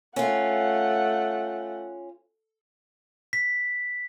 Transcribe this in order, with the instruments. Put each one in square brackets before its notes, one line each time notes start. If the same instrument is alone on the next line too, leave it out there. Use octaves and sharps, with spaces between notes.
[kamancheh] A3 F#5 [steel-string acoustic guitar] C#4 F4
[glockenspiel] B6